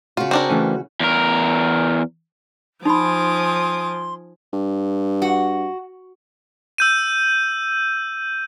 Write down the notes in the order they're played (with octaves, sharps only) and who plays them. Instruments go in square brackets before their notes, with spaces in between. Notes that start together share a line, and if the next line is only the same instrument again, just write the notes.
[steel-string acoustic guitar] C#3 F#4 [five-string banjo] F4
[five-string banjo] C4 D4 A#4
[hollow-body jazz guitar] E3 A3 C#4
[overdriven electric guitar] E2 A#4
[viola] F3 [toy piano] D#4 B5 [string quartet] G#5 D6 D#6 [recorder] C6
[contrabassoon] G2
[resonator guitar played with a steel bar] F#4
[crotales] E6 G6 D#7